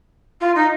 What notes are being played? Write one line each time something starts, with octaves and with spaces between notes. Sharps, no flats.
F4
D#4